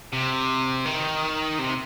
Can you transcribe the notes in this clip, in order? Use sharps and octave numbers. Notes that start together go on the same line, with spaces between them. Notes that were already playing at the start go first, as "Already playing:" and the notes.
C3
D#3
C3